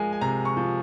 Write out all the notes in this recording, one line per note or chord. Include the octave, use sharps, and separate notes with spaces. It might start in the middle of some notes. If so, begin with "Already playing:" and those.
Already playing: F3 G#3 A#4 G#5
G#5
C3 A#5
C#6
F3